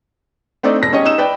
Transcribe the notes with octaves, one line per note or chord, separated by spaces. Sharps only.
A3 C4 D4 D#4 D5
E1 A#6
C#4 G4 C#5 D#5
D#4 E6 E7
B4 D5 G5